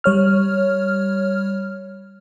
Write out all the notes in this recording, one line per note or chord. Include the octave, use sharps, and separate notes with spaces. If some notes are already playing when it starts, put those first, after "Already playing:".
G3 C#5 F6